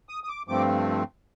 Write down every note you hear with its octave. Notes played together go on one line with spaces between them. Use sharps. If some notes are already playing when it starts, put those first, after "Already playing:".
D#6
D#6
D6
G2 F3 A3 C4 D6